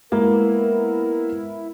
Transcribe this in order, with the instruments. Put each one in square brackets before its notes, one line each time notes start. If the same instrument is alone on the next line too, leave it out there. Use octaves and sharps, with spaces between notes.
[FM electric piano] G#3 [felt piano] A#3 [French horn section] B3 A#4 [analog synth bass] E4